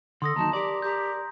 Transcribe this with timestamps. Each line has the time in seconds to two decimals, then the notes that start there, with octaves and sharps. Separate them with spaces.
0.22 D3 A4 C6 D#6 A#6
0.36 D#2 F#3 D#4 A5 A#5
0.53 G4 A#4 D5
0.82 G4 A#5 G6